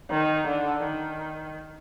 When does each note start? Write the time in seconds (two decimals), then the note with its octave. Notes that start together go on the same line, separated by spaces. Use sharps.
0.11 D#3
0.47 D3
0.84 D#3